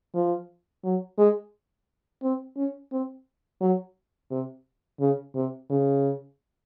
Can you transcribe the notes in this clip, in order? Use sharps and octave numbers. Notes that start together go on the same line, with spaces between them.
F3
F#3
G#3
C4
C#4
C4
F#3
C3
C#3
C3
C#3